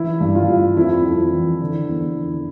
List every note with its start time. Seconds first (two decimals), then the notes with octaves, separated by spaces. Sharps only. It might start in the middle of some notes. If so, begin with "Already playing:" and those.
Already playing: E3 E4
0.20 G2
0.35 F4
0.48 G2
0.77 F2 E4
1.05 F2
1.33 E3
1.61 D3
1.89 E2
2.17 D3